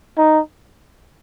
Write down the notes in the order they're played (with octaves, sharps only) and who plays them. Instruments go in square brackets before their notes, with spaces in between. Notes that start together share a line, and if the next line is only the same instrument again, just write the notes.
[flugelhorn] D#4